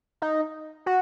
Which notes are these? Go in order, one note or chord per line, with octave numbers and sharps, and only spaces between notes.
D#4
F#4